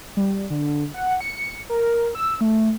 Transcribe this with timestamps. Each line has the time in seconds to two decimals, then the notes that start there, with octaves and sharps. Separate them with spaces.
0.17 G3
0.50 D3
0.94 F#5
1.21 C#7
1.69 A#4
2.15 E6
2.41 A3